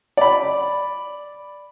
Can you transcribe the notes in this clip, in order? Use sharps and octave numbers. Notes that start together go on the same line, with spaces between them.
D5 B5